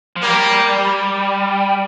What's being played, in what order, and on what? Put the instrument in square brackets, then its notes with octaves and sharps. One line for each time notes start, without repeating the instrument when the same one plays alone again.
[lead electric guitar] F3
[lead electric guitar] G3 [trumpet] A#3